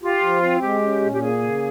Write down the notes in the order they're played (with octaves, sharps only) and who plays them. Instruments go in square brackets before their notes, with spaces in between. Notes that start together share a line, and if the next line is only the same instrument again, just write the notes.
[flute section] F4 [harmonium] G4
[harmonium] F3
C4
[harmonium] G#3 [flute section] G4
[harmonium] C#4
A#2
[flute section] G4
[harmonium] A#3 [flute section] G#4
[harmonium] C#3